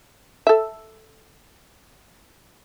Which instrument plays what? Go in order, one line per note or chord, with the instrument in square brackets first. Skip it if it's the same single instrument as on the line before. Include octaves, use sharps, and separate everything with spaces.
[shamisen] A4 E5